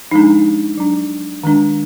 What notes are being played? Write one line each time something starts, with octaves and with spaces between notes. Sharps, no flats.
F3 G#3 D4 D#4
F#3 D4
D#3 G#3 D4